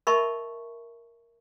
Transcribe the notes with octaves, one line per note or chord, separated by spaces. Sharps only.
A#4 D#5 E5 A5 B5 C#6